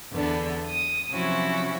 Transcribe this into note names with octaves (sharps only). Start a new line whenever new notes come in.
E2 D3 B3 D4
D#6
C3 F3 F#3 C#4 E4 F#4